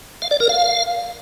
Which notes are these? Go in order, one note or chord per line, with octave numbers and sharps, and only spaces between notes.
F5
D5
A#4
F5